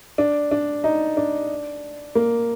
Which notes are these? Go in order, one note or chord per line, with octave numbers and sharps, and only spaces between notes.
D4
D4
D#4
D4
A#3